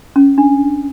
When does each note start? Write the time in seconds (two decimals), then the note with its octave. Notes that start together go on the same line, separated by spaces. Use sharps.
0.16 C#4
0.38 D4